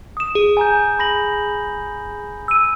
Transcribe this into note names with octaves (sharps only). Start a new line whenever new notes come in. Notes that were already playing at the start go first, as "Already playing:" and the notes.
D#6 E7
G#4
G#5 A#5 G6
B5 A#6 F#7
E6 D#7